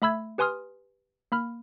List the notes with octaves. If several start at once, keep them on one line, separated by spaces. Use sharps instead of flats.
A3 E5 B5 E6 G#6
G4 B4 G#5 C6 D#6 F6
A#3 B5 F6